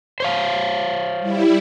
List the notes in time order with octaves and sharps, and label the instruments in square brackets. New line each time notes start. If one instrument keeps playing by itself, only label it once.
[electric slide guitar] C5 C#5 F5
[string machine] G3 E4